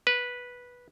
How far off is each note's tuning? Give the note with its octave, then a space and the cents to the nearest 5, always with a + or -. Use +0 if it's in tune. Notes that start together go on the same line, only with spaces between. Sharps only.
B4 -10